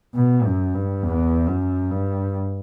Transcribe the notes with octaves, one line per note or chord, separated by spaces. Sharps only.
B2
F#2
G2
E2
F#2
G2